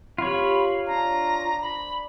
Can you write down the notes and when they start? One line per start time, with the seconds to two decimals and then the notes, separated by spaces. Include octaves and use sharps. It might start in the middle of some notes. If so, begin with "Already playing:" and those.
0.18 C3 F4 C#5 B5
0.86 D4 A#5
1.62 C5 B5